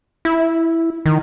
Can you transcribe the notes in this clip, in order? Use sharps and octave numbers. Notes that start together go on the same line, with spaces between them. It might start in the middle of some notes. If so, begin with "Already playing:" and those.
E4
D#3